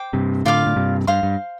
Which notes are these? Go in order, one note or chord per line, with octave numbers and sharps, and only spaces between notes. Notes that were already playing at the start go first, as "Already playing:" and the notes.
Already playing: C5 G5 D6
G2 C3
A2 D3 F4 D5 F5 D6
A2
G2 C3
G2 C5 F5 C6
G2